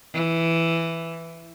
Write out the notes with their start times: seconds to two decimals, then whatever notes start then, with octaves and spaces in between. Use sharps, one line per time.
0.14 E3